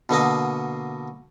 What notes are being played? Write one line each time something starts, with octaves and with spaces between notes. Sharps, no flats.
B2 D3 A#3 D#5